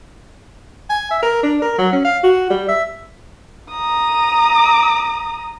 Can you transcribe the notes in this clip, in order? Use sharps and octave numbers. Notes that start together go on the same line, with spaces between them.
G#5
E5
A#4
D4
A#4
F#3
C#4
F5
F#4
G3
E5
A#5 D#6